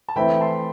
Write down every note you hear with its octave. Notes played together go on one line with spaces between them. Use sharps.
A5
E3 A3 C4 E4 G5 B5
A5 C6